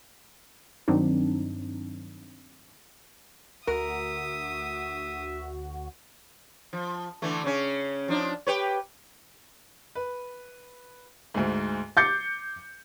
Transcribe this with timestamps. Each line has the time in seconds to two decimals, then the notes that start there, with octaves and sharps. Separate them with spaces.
0.88 G2 D#3 F#3 C4 D4 D#4
3.67 D2 F#4 A#4 E5 D#6
6.73 F3
7.22 D3 E3 A3
7.44 C#3 C#4
8.08 F3 D4 D#4
8.47 G4 B4 C#5
9.95 B4
11.34 D2 G#2
11.97 D6 G6 A6 C7 C#7